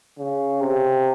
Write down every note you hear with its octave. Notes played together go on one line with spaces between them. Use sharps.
C#3
C3